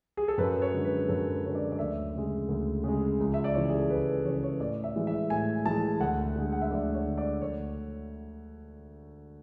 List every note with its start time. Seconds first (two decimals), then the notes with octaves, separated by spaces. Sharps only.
0.17 G#4
0.28 A4
0.38 F#2 B4
0.62 C#5
0.73 D3 G#3
0.85 B4
1.08 F#2 A4
1.32 B4
1.44 D3 G#3 C#5
1.55 D5
1.72 D5
1.79 D2 E5
2.14 C#3 G#3
2.49 D2
2.84 C#3 G#3
3.20 C#2
3.34 E5
3.44 D5
3.54 C#3 E3 C#5
3.69 G#4
3.79 A4
3.90 C#2 B4
4.25 C#3 E3 C#5
4.34 B4
4.43 C#5
4.60 A2 D5
4.84 E5
4.95 E3 G#3
5.07 E5
5.30 A2 G#5
5.65 E3 G#3 A5
6.00 D2 F#5
6.36 D3 G#3
6.53 F#5
6.62 E5
6.71 D2 D5
6.94 C#5
7.06 D3 G#3
7.18 D5
7.41 D2 C#5